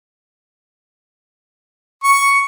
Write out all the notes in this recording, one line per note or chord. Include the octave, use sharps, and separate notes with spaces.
C#6